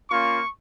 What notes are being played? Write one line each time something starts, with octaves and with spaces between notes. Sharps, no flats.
A#3 C#4 F4 C#6